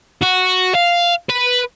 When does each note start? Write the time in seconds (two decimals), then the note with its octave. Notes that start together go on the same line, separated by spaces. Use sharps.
0.23 F#4
0.75 F5
1.30 B4